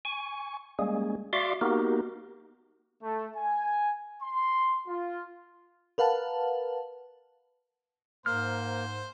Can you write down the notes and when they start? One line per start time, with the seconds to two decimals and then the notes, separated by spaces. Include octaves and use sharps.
0.05 G#5 C#6
0.79 G3 G#3 A#3 C#4 G#4
1.33 F#4 D5 E5 F5 C6 D6
1.61 A#3 B3 D#4 F#4 G4 A#4
3.03 A3
3.37 G#5
4.23 C6
4.88 F4
5.98 A#4 B4 F5 F#5 A5
8.26 G#2 A#3 C5 F6